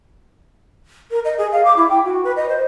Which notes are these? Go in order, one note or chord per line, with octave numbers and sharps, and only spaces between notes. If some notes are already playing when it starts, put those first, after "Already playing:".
A#4
D#5
G#4
F5
D6
E4
G5
F#4
B4
D#5
C5